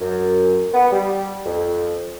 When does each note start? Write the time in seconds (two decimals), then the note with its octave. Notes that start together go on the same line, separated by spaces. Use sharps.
0.01 F#2
0.74 B3
0.91 G3
1.45 F2